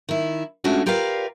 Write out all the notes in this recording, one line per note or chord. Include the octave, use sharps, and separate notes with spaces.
D#3 E4
G#3 A3 C#4 D4 F4 F#4
F4 G4 A#4 B4 D5 F5